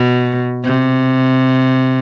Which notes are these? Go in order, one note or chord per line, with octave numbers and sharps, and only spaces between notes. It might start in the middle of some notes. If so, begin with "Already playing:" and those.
Already playing: B2
C3